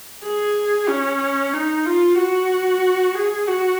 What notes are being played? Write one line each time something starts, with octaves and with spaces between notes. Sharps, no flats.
G#4
C#4
D#4
F4
F#4
G#4
F#4